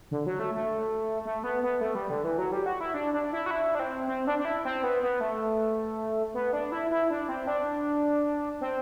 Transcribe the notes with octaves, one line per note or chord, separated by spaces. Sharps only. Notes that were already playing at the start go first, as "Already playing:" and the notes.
D3
F#3
A3
A3
A3
B3
B3
A3
G3
D3
E3
F#3
G3
F#4
E4
D4
D4
E4
F#4
E4
D4
C4
C4
D4
D4
E4
C4
B3
B3
A3
B3
D4
E4
E4
D4
C4
D4
C4